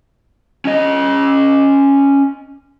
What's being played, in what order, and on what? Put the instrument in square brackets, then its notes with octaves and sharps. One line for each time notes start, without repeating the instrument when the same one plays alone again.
[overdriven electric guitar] C#4 D#5